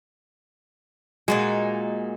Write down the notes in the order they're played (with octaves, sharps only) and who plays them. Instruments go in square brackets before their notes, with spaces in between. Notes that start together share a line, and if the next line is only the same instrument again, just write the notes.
[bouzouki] A#2 D#4 F#4 [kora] G#3